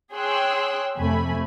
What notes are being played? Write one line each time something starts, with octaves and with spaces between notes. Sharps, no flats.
G#4 C#5 G5 C6 E6 F#6
F2 C3 A3 G#5 B5